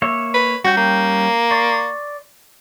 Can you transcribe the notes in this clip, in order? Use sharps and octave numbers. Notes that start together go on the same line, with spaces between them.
A#3 C#5 E5
B4
G3 C#4 F#4 G5
A#3
D5 C6 C#6